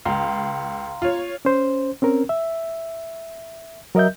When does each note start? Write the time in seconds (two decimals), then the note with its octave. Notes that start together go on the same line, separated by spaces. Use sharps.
0.05 C#2 F5 A#5 C6
1.02 F4 C#5
1.45 C#4 C5
2.02 C4 C#4 A#4
2.29 E5
3.95 F#3 A#4 D#5 E5 G6